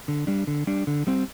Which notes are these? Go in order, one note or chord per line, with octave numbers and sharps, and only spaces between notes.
D3
G3 D4
D3
G3 D4
D3
G3 C4